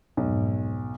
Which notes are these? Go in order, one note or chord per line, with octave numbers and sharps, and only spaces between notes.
B1 F2 G#2